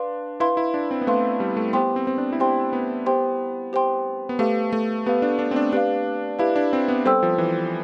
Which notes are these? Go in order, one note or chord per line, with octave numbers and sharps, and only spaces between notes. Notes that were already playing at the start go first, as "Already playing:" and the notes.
Already playing: D4 B4 F5 C6
E4 B4 F5 C6
E4
D4
C4
B3
A3 B4 F5 C6
G3
A3
B3 G4 C5 G5 C6
C4
C4
D4
E4
D4 G4 C5 G5 C6
B3
G4 C5 G5 C6
G4 C5 G5 C6
B3
A3 G4 B4 F5
A3
B3 G4 B4 F5
D4
D4
C4
D4
D4 G4 B4 F5
E4 G4 B4 F5
D4
C4
B3
G3 A4 C5 G5 C6 E6
F3
E3